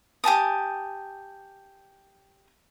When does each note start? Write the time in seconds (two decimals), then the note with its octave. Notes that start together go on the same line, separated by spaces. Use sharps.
0.24 G4 G#5 A5 D#6